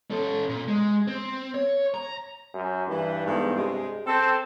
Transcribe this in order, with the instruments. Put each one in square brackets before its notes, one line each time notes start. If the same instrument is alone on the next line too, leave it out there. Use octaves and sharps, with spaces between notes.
[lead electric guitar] C#4 A4
A#2
G#3
C4
C#5
A#5
[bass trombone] F#2
[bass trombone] G2 [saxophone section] E3
[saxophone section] E2 G#2 A3
C3 G#3
[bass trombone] C4 [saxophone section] A4